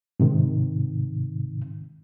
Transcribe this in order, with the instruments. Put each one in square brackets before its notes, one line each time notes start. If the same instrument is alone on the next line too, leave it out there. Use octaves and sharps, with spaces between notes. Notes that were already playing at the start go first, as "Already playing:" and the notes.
[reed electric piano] G#2 C3 D#3